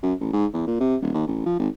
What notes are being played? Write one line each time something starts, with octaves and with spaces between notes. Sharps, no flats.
F#2
A1
G#2
E2
A#2
C3
D#1
D#2
A1
F3
G#1